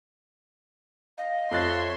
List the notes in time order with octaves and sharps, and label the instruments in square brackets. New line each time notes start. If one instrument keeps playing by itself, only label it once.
[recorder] D#5 [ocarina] F5
[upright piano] F2 F#6 A6 [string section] C#5 E5 C6